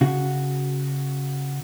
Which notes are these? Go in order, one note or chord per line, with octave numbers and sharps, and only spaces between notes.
C#3 F#4